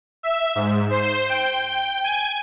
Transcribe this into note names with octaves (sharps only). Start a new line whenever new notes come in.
E5
G#2
C5
G5
G5
G#5